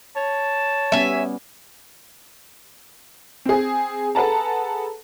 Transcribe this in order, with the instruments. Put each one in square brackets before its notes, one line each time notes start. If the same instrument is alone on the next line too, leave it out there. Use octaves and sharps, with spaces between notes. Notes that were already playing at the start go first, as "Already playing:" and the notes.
[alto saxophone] C#5 [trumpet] A5
[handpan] G3 B3 C#4 [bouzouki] E5 G#5
[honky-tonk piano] C4 G#4
G#4 A4 B4 F#5 A5 A#5